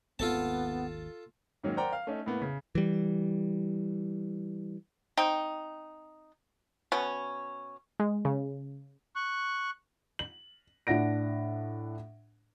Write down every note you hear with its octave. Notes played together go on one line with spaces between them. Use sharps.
G#1 D#2 B3 C4 F4 A4 A5
G#2 D#3 F#3 A#3 C#4
A#4 C5 D5 F#5 G5 A#5
F5
A3 C#4 D#4
A2 A#3 B3
C#3
E3 G3
C4 D#4 G5
B2 B3 C#4
G#3
C#3
C#6 F#6
F#7
A2 D4 F#5 A#6 D7